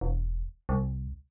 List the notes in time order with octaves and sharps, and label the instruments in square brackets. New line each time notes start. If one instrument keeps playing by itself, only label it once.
[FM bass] E1
C2